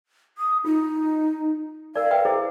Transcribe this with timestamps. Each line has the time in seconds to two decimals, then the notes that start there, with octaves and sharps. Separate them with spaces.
0.38 D#6
0.65 D#4 F4
1.96 A#4 D5 F5
2.11 B4 E5 G5
2.25 E4 G#4 C5